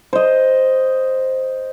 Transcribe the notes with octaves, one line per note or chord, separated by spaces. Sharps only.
C5 D#5